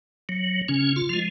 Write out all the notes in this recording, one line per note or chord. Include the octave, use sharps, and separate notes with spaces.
F#3
C#3 C#4
F4
F3 G#3